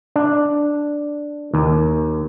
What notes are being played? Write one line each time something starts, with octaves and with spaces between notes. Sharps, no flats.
D4
D#2